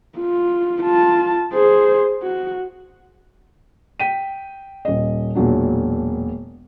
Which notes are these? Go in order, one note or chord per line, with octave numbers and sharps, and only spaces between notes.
F4
F4 A5
G#4 C5
F#4
G5 B6 D#7
D#1 D#5
E1 A#2 F#3 D4